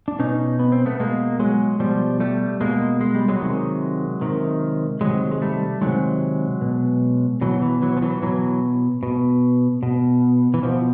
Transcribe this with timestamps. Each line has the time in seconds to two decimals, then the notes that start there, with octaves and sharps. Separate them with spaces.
0.08 D4
0.19 B2 C#4 D#4
0.59 B3
0.72 C4
0.86 A3 B3
1.00 B2 G#3 A#3
1.40 F#3 G#3
1.80 B2 F3 G3
2.20 G3 A3
2.61 B2 G#3 A#3
3.01 G#3
3.15 G3
3.28 F#3 G#3
3.41 C3 D#3
4.21 C3 D#3
5.01 C3 D#3 F#3 G#3
5.31 G#3
5.42 G3 A3
5.81 C3 D#3 F#3 G#3
6.61 B2
7.41 B2 E3 F#3
7.62 E3
7.82 E3 F#3
7.97 F3
8.02 E3 F#3
8.22 B2 E3 F#3
9.03 B2
9.83 B2
10.54 E3
10.63 B2 F3